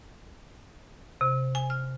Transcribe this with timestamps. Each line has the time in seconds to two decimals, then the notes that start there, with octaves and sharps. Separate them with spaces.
1.21 C3
1.55 G#5
1.70 F6